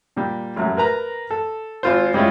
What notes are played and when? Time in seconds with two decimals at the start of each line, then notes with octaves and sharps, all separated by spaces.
0.17 A#2 G3
0.56 A1 F#2
0.77 A#4 B4 A#5
1.31 A4
1.83 G#1 F4 C5
2.14 G3 G#3 C#4 E4 F4